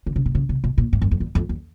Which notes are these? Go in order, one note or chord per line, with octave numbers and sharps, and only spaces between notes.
D3
C#3
C3
C#3
C3
B2
A#2
G#2
F#2
F2
E2
F2
E2